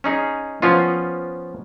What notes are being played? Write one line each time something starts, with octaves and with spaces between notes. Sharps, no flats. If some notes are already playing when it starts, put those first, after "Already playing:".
C#4 D#4 G#4
F3 B3 C#4 F4